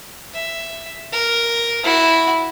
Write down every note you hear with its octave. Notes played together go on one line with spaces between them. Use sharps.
E5
A#4
E4 F#4